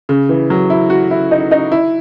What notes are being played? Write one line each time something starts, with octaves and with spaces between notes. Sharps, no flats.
C#3
E3
F#3
E4
F#4
E4
D#4
D#4
E4